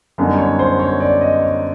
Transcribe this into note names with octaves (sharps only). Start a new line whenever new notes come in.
F#2 D3 G3 B3 D#4
C#5
C5
C#5
D5
D#5
C#5